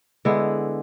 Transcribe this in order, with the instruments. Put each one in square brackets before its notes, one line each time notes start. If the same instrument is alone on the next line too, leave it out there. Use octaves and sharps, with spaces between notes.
[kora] D3 G#3 B3 E4